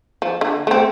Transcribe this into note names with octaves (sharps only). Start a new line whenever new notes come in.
F3
D3
A3 C4